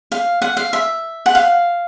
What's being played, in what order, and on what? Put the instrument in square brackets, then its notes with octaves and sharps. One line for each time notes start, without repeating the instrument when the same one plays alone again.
[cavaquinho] F5
F#5
F5
E5
F#5
F5